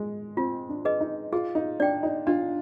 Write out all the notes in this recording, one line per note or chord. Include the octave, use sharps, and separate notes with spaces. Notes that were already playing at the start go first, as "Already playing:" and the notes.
Already playing: G#3
C4 F4
D4
G#4 B4 D#5
D#4
F4 G#4
D#4
D4 D5 G5
D#4
D4 F4